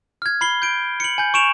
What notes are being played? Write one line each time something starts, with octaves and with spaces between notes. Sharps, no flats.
F6 G#6
B5 C7 G7
G6 D7
C#7 F#7
G#5 G6
C#6 D7 E7 F7